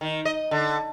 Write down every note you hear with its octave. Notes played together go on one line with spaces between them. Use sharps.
D#3
D#5
D3